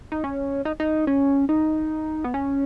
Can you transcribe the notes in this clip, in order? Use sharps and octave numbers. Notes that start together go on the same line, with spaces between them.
D#4
C#4
D#4
D#4
C#4
D#4
B3
C#4